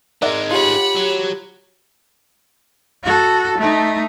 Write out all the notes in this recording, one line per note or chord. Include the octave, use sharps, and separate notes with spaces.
D#3 G#3 A#4 D5 E5 F#5
F4 G4 C#5 F#5 B5
F#3
F#4 A4
A3 D#4